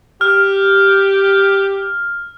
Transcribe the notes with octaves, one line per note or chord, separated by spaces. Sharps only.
G4 F6